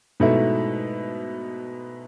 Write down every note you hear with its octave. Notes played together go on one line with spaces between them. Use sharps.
G#2 B2 A3 E4